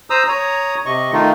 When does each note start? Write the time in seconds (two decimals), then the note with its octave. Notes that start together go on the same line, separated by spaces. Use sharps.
0.10 C5 A#5 D#6 E6
0.28 C#5 A#5 D#6
0.86 C3 D#5 C#6
1.12 D#3 A3 D#4 F4